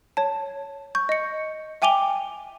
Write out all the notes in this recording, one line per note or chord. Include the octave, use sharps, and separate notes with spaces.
C#5 A5
C#6 G6
D#5 C#7
E5 G5 G#5 D6 F7 G7